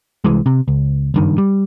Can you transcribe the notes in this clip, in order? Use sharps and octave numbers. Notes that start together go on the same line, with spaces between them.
C2 E3 G#3
C3
C#2
F#1 G2 D#3
G3